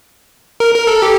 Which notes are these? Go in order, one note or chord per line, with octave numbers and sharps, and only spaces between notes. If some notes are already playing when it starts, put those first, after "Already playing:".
A#4
A#4
A4
G4